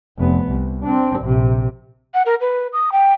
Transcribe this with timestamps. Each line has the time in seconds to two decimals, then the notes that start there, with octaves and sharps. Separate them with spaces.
0.18 F1 B3
0.48 C2
0.83 C4 D4
1.20 A#1 C3
2.14 F#5
2.26 A#4
2.41 B4
2.73 D#6
2.92 G5